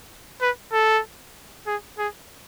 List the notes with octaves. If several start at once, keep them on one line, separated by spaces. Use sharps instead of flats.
B4
A4
G#4
G#4